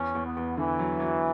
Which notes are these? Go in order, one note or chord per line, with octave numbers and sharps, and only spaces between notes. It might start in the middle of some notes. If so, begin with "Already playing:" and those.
Already playing: E2 C#4
E2
B3
E2
D3 E3
F#3
F#3